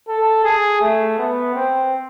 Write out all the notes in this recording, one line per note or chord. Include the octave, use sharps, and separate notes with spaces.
A4
G#4
A3
B3
C4